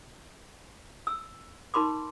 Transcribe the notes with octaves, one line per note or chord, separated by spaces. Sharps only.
E6
D#4 A#4 B5 C6 D6